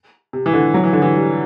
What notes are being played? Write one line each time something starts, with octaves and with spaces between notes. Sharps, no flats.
C3
E3
D3
F#3
E3
D3
E3
G3